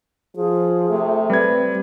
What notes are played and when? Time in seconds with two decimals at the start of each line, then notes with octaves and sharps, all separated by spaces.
0.36 F3 G#4
0.90 C3 A3
1.30 G3 C4 B4 G#6